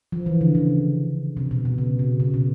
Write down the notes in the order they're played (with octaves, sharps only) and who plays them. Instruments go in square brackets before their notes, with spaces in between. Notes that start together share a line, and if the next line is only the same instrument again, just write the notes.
[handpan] F3
E3
D3
C#3
C3
B2
B2
C#3
C3
C#3
B2